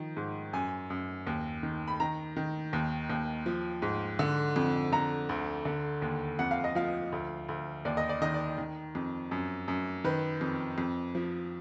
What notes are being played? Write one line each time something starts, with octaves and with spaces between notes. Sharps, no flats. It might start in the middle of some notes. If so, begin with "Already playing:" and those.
Already playing: D#3 F3
G#2
F#2 G#5
F#2
D#2
D#3
B5
D#3 A#5
D#3
D#2
D#2
F3
G#2
D3
F2
D3 A#5
D2
D3
D#2
F2 F#5
F5
D#5
F3 F5
D2
D2
D#2 D5
D#5
D5
D#3 D#5
D5
D#3
F2
F#2
F#2
D#3 B4
F2
F2
F3